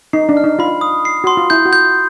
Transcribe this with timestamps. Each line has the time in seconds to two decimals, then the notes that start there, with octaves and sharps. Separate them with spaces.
0.13 D#4 C7
0.29 D4
0.37 F6
0.44 D#4
0.59 F4 B5
0.81 D#6
1.05 C7
1.24 F#4 C6
1.37 F4
1.50 E4 G6
1.65 F#4
1.73 G6